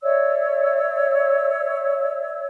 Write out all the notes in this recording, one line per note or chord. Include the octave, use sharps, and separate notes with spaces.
C#5 D5 E5 E6